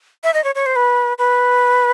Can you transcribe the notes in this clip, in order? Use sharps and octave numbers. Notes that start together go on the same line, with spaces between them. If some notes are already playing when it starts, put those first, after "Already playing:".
E5
D#5
C#5
C#5
C5
B4
B4